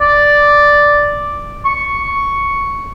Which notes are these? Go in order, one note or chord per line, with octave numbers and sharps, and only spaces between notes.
D5
C#6